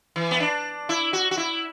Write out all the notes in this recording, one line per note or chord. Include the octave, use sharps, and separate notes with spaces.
E3
B3
D4
E4
F#4
F#4
E4